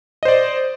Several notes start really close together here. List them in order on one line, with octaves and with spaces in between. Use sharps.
D#5 C5 D5